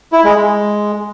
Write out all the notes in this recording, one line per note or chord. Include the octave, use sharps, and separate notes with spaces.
E4
G#3
G#3